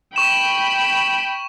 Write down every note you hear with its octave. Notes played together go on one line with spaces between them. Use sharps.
G5 B5 C#6 E7